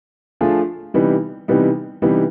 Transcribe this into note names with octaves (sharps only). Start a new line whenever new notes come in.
F3 A3 D4 F4 G#4
C3 E3 G3 B3 D#4
C3 E3 G3 B3 D#4
C3 E3 G3 B3 D#4